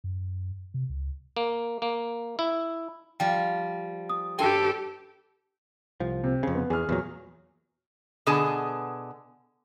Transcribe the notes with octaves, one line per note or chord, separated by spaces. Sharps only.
F#2
C3
C#2
A#3
A#3
E4
F3 G3 G5
D#6
G2 G4 A4 G5 G#5 C6
C2 F3
C3
F2 C#3
B3
E2 G#4 F6
E2 A#2 F#3
B2 D3 B3 G#4 G#5 A5